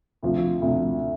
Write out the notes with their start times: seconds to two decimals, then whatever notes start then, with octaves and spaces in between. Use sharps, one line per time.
0.23 D2 C3 F3
0.62 D2 C3 F3